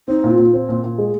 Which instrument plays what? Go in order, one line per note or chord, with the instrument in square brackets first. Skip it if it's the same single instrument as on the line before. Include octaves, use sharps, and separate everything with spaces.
[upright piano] C4 [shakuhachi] D#4
[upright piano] A#2
[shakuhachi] F4
[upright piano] A#2
C4
A#2
A#2
G#3